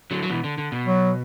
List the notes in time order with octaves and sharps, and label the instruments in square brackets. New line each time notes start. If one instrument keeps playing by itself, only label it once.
[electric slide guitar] D3 F#3
F#3
B2 E3
D3
D3
B2
[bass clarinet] F#3